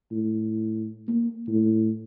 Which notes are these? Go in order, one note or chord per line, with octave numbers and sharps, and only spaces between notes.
A2
A#3
A2